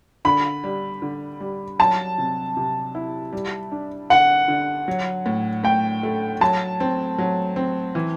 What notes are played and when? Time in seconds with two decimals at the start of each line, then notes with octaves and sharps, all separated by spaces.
0.25 D3 B5
0.64 G3
1.02 D3
1.40 G3
1.79 F#3 A5
2.18 C3
2.57 C3
2.95 E4
3.33 G3
3.72 D4
4.10 D3 F#5
4.48 D3
4.88 F#3
5.26 A2
5.64 A2 G5
6.03 A3
6.41 F#3 A5
6.80 C4
7.19 F#3
7.56 C4
7.95 E3